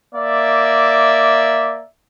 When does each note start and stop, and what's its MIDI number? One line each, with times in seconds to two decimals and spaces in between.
0.15 1.82 58
0.15 1.82 74
0.15 1.82 76